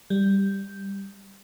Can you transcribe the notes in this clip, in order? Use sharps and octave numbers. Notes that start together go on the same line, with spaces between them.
G3